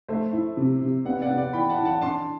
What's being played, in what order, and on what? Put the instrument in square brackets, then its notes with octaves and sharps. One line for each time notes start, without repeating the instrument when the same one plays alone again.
[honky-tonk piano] A3 [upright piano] C5 E5
[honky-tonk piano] E4
C3
C3
[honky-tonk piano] B3 [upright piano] D5 F#5
[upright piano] D5 F#5
[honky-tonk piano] B3
[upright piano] D5 F#5
[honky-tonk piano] E3 [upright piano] G5 B5
[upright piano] F#5 A5
[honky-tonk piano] E3
[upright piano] F#5 A5
[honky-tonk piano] D4 [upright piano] A5 C6